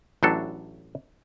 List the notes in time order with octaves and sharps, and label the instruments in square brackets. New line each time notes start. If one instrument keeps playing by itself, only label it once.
[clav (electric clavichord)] A1 A2 F#3 D4 A4